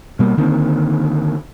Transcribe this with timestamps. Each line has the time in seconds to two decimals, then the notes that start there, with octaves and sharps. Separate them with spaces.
0.19 B2 G3 A#3
0.37 D3 D#3 A#3 C4